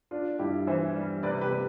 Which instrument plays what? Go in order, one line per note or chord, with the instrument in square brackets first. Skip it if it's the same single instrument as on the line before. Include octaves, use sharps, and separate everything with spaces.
[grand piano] D4 [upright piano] F4
[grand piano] G2 [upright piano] E4 G4
[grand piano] E3 [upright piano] C5 E5
[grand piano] G3
[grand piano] C3 [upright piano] B4 D5
[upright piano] G4 B4
[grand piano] C3